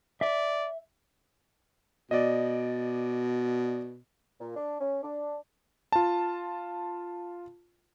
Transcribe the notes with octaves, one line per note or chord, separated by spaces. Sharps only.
D5 E5
B2 D5 D#5
A#2
D4
C#4
D4
F4 A5